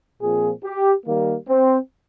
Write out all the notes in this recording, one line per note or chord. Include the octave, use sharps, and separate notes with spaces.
A#2 F3 C4 G#4
G4
D#3 G3 A#3
C4